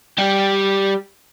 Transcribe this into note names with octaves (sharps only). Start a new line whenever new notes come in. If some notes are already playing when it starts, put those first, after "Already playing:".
G3 G4